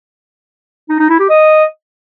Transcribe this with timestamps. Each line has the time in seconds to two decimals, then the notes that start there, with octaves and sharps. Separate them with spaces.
0.89 D#4
0.99 D#4
1.09 E4
1.19 G4
1.29 D#5